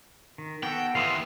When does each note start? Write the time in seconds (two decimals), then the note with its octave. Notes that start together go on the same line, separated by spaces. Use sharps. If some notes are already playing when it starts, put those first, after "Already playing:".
0.38 D#3
0.63 B3 F#4 A4 G5
0.95 D#2 E3 F5 C6 D#6